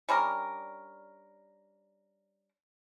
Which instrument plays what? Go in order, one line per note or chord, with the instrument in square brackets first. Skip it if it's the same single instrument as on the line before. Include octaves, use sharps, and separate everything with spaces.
[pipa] G3 C#4 D4 A#4